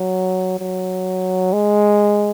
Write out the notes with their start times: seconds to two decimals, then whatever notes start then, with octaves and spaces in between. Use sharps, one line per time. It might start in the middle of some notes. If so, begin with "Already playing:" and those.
Already playing: F#3
0.59 F#3
1.53 G#3